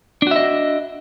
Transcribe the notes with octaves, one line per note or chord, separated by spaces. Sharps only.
D4 F#4 D#5 E5